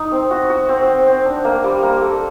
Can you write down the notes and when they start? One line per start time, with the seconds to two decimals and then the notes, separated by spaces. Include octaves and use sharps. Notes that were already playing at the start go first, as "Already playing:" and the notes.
Already playing: D#4
0.12 C4
0.31 F#4
0.50 F#4
0.69 C4
0.87 C4
1.07 C4
1.25 D4
1.44 A#3
1.64 G3
1.82 A#3
2.02 A4